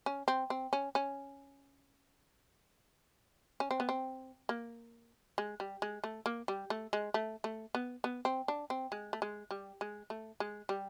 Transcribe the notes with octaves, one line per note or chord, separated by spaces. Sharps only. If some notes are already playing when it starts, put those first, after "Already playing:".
C#4
C4
C4
C#4
C#4
C#4
C4
B3
C4
A#3
G#3
G3
G#3
A3
A#3
G3
A3
G#3
A3
A3
B3
B3
C4
D4
C4
G#3
A3
G#3
G3
G#3
A3
G#3
G3